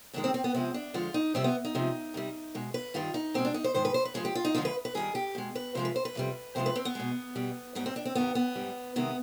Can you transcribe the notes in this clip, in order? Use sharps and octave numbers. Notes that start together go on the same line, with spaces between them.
G2 D#3 G#3 D4
C4
C4
B3
C3 F3 G#3 C4
D4
F2 D3 F3 G#3 F4
D#4
F2 C3 G3 C4
B3
D#4
C3 F3 G#3
C3 G3
B2 G#3
B4
G2 D#3 G3 F4
D#4
B2 G#3 C4
D4
D#4
C5
G#2 D#3 G#3 C5
B4
C5
B4
G2 F3 G#3 G#4
G4
F4
D#4
F2 D3 F3 G#3 F4
B4
B4
G2 D#3 G3 G#4
G4
B2 G#3
B4
C3 F3 G#3 C5
B4
C5
B4
F2 C3 G3
F2 C3 F3 G#3 C5
B4
C4
B3
B2 G#3
B2 G3
G#2 G3 B3
C4
D4
C4
G2 D#3 G3 B3
B3
G#2 G3
C3 D#3 G#3 B3